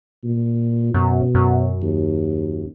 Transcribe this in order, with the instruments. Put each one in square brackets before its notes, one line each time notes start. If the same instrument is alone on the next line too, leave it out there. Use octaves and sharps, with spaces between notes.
[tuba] A#2
[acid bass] F#2 [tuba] B2
[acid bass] F#2
[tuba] D#2